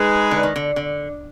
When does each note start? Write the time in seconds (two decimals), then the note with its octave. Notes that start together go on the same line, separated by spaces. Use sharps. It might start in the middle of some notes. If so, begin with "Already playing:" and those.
Already playing: G#3 D#4 G#4 B4
0.31 D3
0.43 D#3
0.56 D3
0.76 D3